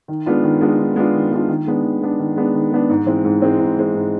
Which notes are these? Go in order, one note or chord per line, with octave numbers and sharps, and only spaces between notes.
D#3
G#3 B3 D4 F4
D#3
G#3 B3 D4 F4
D#3
G#3 B3 D4 F4
D#3
G#3 B3 D4 F4
D#3
G#3 B3 D4
D#3
G#3 B3 D4
D#3
G#3 B3 D4
D#3
G#3 B3 D4
G#2
E3 G#3 C4
G#2
E3 G#3 C4
G#2
E3 G#3 C4
G#2